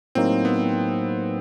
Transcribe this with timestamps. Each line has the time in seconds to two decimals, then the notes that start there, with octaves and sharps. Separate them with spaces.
0.15 A2 F#3 A#3 C4 D#4
0.45 B3